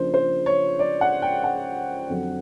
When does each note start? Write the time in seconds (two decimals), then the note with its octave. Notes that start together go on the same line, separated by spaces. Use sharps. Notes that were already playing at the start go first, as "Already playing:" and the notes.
Already playing: C#3 F3 A#3 D4 C5
0.14 C5
0.46 C#5
0.79 D5
1.01 F#5
1.22 G5
1.44 F#5
2.09 F2 D3 F#3